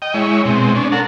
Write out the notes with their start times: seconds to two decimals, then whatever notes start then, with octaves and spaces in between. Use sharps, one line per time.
0.02 D#5 G5
0.14 G#3 E4 C#5
0.45 B2 G#3 C4
0.75 C#4 D4
0.92 A4 A#4 F#5